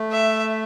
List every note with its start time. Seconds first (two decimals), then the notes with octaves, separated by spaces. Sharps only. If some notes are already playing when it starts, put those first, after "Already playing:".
Already playing: A3
0.12 E5